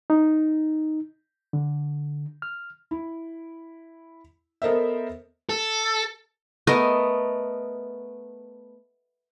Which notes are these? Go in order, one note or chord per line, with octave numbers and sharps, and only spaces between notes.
D#4
D3
F6
E4
B3 A4 A#4 C5 D#5 E5
A4
A3 B3 A#4 D#5